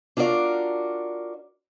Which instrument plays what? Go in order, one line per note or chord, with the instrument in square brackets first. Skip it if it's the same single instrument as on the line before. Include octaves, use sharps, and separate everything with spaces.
[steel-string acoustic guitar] D4 F4 F#4 A#4 D5